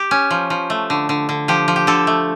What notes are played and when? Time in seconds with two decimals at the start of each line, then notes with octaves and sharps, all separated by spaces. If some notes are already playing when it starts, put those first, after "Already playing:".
Already playing: G4
0.11 C#4
0.30 F3
0.50 F3
0.70 A3
0.90 D3
1.09 D3
1.29 D3
1.48 F3 G4
1.68 F3
1.76 G4
1.87 D3 A4
2.07 A3